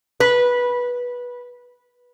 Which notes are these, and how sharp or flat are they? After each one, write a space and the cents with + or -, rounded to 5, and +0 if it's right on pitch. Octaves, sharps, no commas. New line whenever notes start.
B4 -15